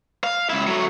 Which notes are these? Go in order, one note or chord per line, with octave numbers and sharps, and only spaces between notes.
F5
C#2 E4
F#3 A3